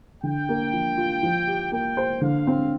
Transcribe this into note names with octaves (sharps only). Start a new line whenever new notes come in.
D3 G5
A#3
F3
F4
F3
G4
A#3 G5
C5
D3 F5
C4